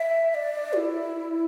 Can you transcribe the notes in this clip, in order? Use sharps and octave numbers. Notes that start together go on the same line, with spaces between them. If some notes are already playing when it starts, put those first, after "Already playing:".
Already playing: E5
E5
D5
F#4
E4